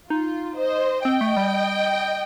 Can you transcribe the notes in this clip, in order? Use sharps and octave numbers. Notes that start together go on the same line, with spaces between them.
D#4 F4
C5 D#5
C4 D#5 G5
A3
G3